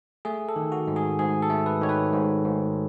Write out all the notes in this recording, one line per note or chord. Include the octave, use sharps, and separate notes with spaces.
A3 G#4
A4
D#3
F#4
G#2
G#4
G#2 G#4
A4
A3
B4
D#3 C#5
B4
G#2
G#2